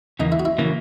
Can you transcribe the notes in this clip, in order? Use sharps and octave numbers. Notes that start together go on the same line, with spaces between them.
E2 C#3 E3 A#3 D#4
E4
F#4
E4
C#3 E3 A#3